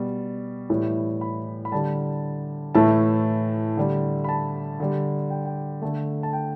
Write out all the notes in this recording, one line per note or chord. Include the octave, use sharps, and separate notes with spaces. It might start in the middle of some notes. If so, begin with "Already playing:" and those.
Already playing: B2 G3
A2 E3 G3
B5
B5
D3 G3 A5
A2 E3 A3 A5
D3 G3
B5
A5
D3 G3
G5
G5
D3 A3 A5
A5
G5